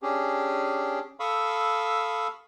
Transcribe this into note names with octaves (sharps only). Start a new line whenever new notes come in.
C#4 D4 G4 G#4
A4 F5 B5 C#6 D#6 E6